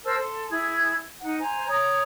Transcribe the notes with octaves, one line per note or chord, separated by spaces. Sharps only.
A#4 C5 A5 E6
A4 C6
E4 G#4 G#6
D#4 F#5
C5 G#5 A#5
C#5 A#5 D#6